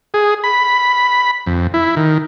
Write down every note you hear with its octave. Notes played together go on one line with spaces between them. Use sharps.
G#4
B5
F2
E4
D#3